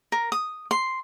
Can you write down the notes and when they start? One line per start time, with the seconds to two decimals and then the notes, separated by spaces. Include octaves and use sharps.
0.12 A#4
0.32 D#6
0.71 C6